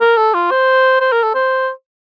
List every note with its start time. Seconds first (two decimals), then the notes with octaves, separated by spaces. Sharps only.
0.01 A#4
0.17 A4
0.34 F4
0.51 C5
1.01 C5
1.12 A#4
1.23 A4
1.34 C5